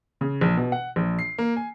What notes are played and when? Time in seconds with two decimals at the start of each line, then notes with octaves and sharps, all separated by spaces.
0.21 C#3
0.41 A#1
0.57 B2
0.72 F#5
0.96 A#1
1.19 C7
1.38 A#3
1.57 G#5